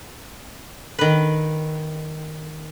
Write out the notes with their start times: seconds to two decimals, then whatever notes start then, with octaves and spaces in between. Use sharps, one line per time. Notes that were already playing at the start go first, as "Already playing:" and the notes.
0.99 D#3 B4